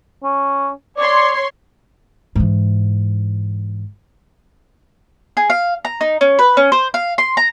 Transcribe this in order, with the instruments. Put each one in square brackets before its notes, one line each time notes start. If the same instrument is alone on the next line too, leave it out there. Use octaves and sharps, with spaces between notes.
[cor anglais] C#4
[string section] C#5 C6 [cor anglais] D5
[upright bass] G#2 E3
[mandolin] G#4
F5
A#5
D#4
C#4
B4
C#4
C5
F5
C6
A#5